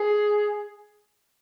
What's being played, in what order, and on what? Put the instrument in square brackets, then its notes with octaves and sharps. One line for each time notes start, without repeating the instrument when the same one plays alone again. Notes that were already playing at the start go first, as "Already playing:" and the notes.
Already playing: [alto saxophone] G#4